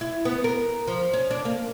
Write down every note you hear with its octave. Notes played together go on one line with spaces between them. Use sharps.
E4
B3
A#4
F3
C#4
D4
A#3